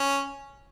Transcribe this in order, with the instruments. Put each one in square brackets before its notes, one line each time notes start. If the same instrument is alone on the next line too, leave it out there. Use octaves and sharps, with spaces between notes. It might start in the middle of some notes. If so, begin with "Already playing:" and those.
Already playing: [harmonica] C#4